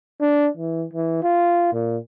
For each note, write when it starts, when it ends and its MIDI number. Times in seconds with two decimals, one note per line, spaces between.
0.21 0.48 62
0.57 0.86 52
0.93 1.18 52
1.23 1.68 65
1.73 1.97 46